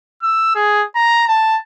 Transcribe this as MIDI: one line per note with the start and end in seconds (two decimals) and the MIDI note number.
0.22 0.55 88
0.55 0.83 68
0.95 1.24 82
1.28 1.58 81